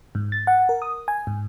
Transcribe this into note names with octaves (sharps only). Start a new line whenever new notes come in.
G#2
A6
F#5
A#4
D#6
G#5
G#2